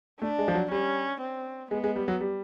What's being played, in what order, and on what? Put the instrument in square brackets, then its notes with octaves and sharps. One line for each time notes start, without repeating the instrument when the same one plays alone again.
[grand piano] A3 [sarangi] D4
[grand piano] G#3
F3
F#3
[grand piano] G3 [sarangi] C#4
[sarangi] C4
[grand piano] G#3 [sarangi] B3
[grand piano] G#3
G3
F#3
G3